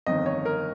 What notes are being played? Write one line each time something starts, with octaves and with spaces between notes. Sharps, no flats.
G1 F2 D#3 D#5
C#5
A#4